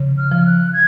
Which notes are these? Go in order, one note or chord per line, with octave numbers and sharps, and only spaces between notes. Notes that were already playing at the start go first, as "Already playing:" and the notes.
Already playing: C#3 F3
F6
F3
F#6
G#6